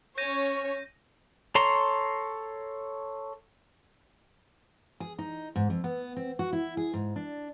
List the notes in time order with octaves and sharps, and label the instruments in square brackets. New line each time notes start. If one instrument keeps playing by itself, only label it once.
[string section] C#4 C#5 [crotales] G6 A#6 D#7
[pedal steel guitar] A4 C#5 A#5 C6
[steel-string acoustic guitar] G#4
D#4
G#2
F2
B3
C4
F#4
E4
G#4
G#2
D4